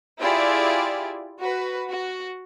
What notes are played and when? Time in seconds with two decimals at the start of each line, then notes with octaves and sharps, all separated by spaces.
0.21 E4 F4 G4 G#4 D5
1.40 F#4 B4
1.90 F#4